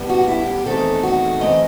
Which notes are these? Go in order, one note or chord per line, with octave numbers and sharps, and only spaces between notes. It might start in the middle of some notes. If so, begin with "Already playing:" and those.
Already playing: A2 G3 B3
F#4
E4
G4
E2 D#3 A3 C4 A4
F#4
F#2 E3 A3 C4 D#5